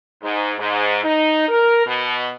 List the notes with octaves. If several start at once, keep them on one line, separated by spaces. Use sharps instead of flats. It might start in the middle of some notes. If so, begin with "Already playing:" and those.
G#2
G#2
D#4
A#4
B2